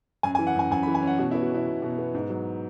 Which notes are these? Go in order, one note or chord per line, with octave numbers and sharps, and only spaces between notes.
F#2 G#5
G#5
E3
F#5
F#2 G#5
F#2 G#5
B5
E3
G#5
C#4
F#5
B2 F#4
E4
B3
F#4
B2 E4
B2
B2
B3
G#2
F#3